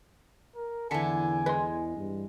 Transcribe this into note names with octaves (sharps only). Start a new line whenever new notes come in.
A#4
E2 D3 E3 G#5 A5 B6 C#7
G#3 B4 C6
G2